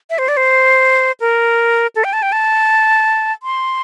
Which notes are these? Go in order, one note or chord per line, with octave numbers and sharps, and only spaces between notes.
E5
C5
D5
C5
A#4
A4
G5
A5
G5
A5
C6